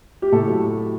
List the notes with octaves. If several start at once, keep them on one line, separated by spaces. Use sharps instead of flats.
G4
A2 A4
F#3